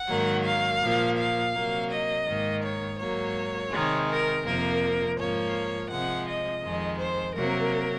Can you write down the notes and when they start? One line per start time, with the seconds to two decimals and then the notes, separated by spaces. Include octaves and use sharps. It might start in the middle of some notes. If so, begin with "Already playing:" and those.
Already playing: F#5
0.08 G#2 D#3 F#3 A#3
0.45 F5
0.81 A#2 F3 A#3
1.18 F5
1.54 C3 F#3 A#3
1.90 D#5
2.27 G#2 D#3 A#3
2.63 C#5
3.00 G#2 F#3 A#3 C#5
3.72 C3 D#3 G#3
4.08 A#4
4.45 F2 C3 F3 A#3 A#4
5.17 G#2 F3 A#3 C#5
5.90 C3 F3 G#3 F#5
6.27 D#5
6.63 F2 D#3 G#3
6.99 C5
7.35 C3 F#3 A#3 A#4